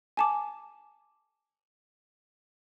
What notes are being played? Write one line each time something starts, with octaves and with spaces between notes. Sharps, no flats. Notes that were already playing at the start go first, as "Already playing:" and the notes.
G#5 A5 D6